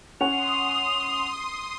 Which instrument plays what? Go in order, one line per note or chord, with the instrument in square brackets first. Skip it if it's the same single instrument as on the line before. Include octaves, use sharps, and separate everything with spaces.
[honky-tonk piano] C#4 F#5 [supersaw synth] C6 D#6 [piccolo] F7